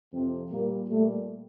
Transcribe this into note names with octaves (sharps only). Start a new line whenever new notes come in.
F2 C3 F3 C4
A#2 G3 A#3
A#2 G3 A3